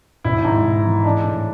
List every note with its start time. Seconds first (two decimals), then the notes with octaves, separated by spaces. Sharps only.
0.25 G#1 E4
0.45 G#2
0.64 G#1
0.85 E3
1.04 G#3 D4
1.24 A2